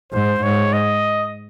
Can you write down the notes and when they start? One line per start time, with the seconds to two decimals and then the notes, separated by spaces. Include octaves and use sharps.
0.13 G#2 C5
0.43 G#2 C#5
0.73 D#5